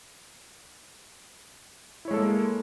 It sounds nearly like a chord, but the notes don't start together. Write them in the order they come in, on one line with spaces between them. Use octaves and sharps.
E4 C#5 G#3 A4 A#3